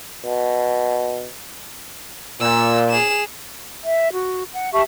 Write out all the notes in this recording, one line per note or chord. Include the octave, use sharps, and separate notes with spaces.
B2
A#2 E6
G#4 E7
E5
F#4
F#5
G4 E5 A5 C#6